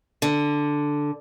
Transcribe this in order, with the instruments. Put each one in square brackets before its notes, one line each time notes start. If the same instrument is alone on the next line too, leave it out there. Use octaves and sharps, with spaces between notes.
[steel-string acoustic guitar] D3